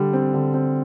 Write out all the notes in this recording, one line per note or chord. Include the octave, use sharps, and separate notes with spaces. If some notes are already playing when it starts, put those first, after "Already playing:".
Already playing: D3 G3
C4
D3
C4